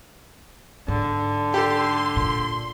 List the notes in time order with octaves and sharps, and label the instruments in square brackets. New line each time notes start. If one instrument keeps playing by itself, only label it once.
[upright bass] G#2 [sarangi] D3
[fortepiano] G4 A4 [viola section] C6
[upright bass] A#2